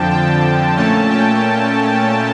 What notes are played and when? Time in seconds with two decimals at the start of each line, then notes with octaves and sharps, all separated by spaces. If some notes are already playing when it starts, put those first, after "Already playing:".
Already playing: F2 D3 F3 G5 A5
0.10 G5
0.77 A#2 A3 C#4 A5
1.10 G5